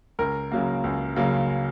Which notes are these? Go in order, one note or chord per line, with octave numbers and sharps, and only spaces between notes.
C#2 A#4
C#3 F#3 A#3
C#2
C#3 F#3 A#3